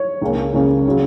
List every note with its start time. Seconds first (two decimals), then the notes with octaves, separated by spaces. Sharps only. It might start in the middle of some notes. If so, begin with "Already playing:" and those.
Already playing: C#5
0.22 C#2 C#3 A#3 C#4
0.53 C#2 C#3 A#3 C#4
0.87 C#3 F#3